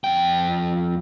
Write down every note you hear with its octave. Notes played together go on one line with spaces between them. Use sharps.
F2 G5